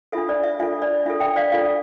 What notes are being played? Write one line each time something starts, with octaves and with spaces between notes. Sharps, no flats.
D4 F4 A4 E5
D5
E5
D4 F4 A4 E5
D5
D4 F4 A4 E5
E5 G5
D5 F5
D4 F4 A4 D5 F5